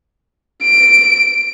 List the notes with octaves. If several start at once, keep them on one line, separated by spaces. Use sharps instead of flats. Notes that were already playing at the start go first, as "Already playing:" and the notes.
D7